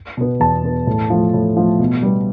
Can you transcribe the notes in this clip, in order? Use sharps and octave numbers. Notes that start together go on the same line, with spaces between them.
B2 B3
E2 A5
B2 B3
A2
F3 A3
A2
F3 A3
B2
G3 B3